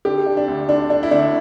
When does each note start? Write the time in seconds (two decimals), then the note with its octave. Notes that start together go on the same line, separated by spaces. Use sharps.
0.05 D3 G4
0.26 D3
0.37 D4
0.48 D2
0.69 D3 D4
0.90 D3 D4
1.03 E4
1.11 D2 D4